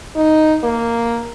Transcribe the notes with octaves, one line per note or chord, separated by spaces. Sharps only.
D#4
A#3